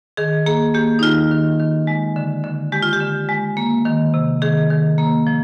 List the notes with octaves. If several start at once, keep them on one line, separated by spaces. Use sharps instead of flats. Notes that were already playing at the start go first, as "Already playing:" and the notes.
D#3 G#4
A#3 G#4
A#3 G4
D#4
D#3 F4
D#3
D#3
G#3
D3
D3
G#3 G4
F4
G4
D3
G#3
A#3
D#3
C3
D#3 G#4
D#3
A#3
F3